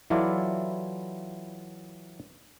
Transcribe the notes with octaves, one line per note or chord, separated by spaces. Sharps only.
E3 F#3 E4 F4 A4 D5